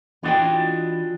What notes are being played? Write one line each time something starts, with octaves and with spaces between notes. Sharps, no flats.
E3 D4 F4 F#4 D#5 G5